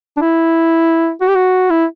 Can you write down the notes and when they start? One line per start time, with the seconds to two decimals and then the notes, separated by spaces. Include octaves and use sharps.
0.17 D4
0.22 E4
1.21 F#4
1.28 G4
1.35 F#4
1.70 E4